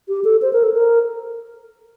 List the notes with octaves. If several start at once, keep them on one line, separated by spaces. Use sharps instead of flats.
G4
A4
C5
A#4
A4
A#4